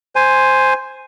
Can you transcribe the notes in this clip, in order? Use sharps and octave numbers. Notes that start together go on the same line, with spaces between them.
C5 G#5